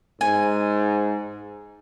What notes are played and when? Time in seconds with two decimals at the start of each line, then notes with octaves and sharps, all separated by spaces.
0.21 G#2 G#5